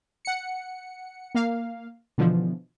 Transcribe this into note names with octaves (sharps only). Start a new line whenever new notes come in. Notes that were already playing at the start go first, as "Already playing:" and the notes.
F#5 C#7
A#3 F5
B2 D3 E3 F3